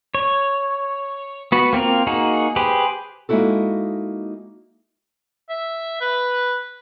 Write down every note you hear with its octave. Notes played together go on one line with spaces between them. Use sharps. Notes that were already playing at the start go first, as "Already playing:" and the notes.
C#5
B3 F#4
A#3 C4 F4 A#4
A#3 D#4 F#4 G#4
G4 G#4 B4 C5
G#3 A#3 D#4 E4 F#4 A4
E5
B4